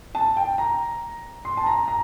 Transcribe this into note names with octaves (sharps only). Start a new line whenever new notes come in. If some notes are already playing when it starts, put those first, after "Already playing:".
A5
G5
A#5
C6
A5
A#5
A#5